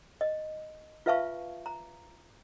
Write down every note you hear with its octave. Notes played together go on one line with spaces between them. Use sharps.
D#5
F4 B4 E5 F5 A5 C#6
A#5